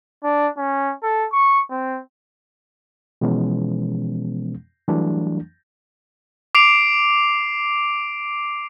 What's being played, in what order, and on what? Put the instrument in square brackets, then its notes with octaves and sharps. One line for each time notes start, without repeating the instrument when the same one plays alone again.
[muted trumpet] D4
C#4
A4
C#6
C4
[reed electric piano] B2 E3 F3 G#3 B3 C#4
E3 F#3 G3 A3 D4
[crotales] D6 C7 D7 F7